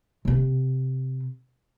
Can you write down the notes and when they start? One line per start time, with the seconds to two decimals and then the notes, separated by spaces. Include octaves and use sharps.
0.25 C3 C4